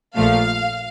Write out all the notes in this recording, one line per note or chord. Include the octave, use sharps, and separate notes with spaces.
A#1 A#2 F3 A3 F5